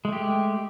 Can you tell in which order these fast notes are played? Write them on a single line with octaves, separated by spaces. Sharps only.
G#3 A3 G4